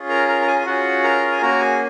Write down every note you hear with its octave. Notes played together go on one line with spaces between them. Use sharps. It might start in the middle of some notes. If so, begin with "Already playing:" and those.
Already playing: C#4 F4 G#4
A#4 A#5
A#4 A#5
A#5
G#4 G#5
G#5
C#4 F4 F#4 G#4 F#5
A#4 A#5
G#5
A#3 C#4 F#4 A#4 A#5
G#4 G#5